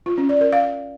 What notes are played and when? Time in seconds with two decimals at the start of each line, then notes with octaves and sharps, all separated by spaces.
0.06 F4
0.18 C#4
0.29 D5
0.41 A#4
0.53 F5